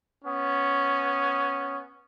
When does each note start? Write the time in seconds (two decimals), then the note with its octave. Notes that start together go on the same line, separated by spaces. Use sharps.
0.25 B3 C#4